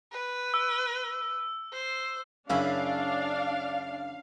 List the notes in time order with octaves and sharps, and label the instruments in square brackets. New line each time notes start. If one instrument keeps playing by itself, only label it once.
[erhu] B4
[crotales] E6
[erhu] C5
[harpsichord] F#2 C#3 [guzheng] C#4 E4 B5 [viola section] D4 [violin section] F5